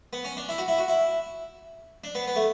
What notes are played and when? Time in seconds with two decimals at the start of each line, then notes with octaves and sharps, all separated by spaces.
0.13 B3
0.24 C#4
0.37 D4
0.49 E4
0.58 F#4
0.68 E4
0.78 F#4
0.88 E4
2.04 D4
2.15 B3
2.27 B3
2.36 A3